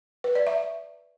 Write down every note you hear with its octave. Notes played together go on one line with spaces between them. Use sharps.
B4
D5
E5